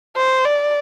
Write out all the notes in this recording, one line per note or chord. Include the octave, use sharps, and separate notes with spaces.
C5
D5